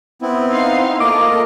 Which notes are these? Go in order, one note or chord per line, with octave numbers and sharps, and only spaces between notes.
B3 C4 E4
D#4 F5 C6
A3 A#3 F4 A#4 D#5 D6